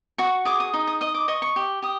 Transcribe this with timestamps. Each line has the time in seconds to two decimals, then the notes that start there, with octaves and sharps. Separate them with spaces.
0.18 F#4 C#6
0.45 G#4 D6
0.60 D#6
0.73 D#4
0.87 D#6
1.01 D#5 D#6
1.14 D6
1.28 D#5 C#6
1.42 C#6
1.56 G4
1.82 G4 D#6